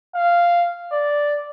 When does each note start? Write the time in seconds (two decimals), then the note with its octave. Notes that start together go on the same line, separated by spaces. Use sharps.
0.15 F5
0.92 D5